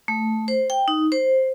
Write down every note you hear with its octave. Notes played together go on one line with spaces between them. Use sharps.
A3
C5
G5
D#4
C5